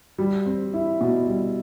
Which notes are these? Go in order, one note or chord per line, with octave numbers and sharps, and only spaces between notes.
G3
C4
E4
B2
G3